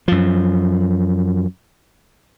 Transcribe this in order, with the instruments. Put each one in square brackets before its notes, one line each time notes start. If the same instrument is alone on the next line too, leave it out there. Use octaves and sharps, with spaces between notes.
[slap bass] F#2 F3